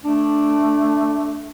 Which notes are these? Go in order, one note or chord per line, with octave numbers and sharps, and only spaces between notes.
A3 D4